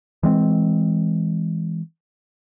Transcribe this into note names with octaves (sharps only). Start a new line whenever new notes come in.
E3 G#3 C4